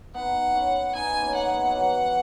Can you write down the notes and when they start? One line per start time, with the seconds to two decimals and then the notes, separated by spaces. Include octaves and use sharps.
0.14 B3 D#4 F#5
0.55 C#4 E4
0.95 B3 D#4 G#5
1.22 A#3 C#4
1.34 F#5
1.48 G#3 B3
1.67 F#3
1.75 E3